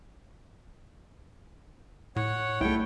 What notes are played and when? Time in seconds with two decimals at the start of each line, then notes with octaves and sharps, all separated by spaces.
2.16 A2 C#5 F#5
2.61 C2 A3 E4 C#5 G5